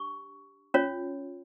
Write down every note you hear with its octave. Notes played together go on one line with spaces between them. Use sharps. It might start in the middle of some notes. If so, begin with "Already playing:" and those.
Already playing: D4 G4 C#6
C#4 F4 C#5